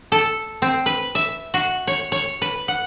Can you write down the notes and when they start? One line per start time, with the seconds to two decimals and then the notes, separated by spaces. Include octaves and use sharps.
0.12 A4
0.62 C4
0.86 B4
1.15 E5
1.54 F#4
1.87 C#5
2.12 C#5
2.42 B4
2.68 F#5